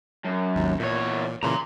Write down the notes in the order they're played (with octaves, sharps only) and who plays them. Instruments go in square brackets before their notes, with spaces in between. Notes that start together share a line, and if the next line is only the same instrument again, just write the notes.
[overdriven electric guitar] F#2
[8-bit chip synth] G#1 D#2
[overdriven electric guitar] E2 C#5 [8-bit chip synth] A#2
[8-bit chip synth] A#2 C#3 E3 [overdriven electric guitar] A#5 C6